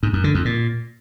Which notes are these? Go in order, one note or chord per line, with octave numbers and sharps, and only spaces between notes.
G#2
F#2
D3
F2
A#2